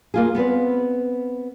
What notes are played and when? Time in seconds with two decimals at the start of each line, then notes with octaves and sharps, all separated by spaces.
0.14 A#3 F4 G#4
0.35 B3 C4 B4 D5